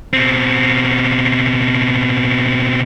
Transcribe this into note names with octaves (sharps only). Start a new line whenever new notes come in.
B2 C4